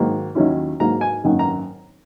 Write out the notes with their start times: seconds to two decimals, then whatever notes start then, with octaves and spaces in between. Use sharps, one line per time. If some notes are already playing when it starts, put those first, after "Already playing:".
Already playing: G#2 D#3 F#3 A#3
0.35 D#2 D#3 F#3 C#4 E4
0.80 G#2 F#3 A#3 A#5
1.01 G#5
1.24 G#1 F#2 D#3 A#3
1.39 A#5